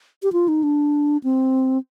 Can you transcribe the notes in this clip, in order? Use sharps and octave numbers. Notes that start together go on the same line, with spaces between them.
G4
F4
D#4
D4
C4